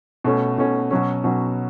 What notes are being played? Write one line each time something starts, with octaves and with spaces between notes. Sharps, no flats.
B2 A3 C#4
B2 A3 C#4
B2 F#3 C#4
B2 F#3 C#4